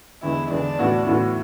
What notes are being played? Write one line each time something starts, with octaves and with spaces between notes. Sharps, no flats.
E2 D3 G#3 B3 E4
E2 D3 G#3 B3 D4
A2 E3 B3 F#4
A2 E3 B3 F#4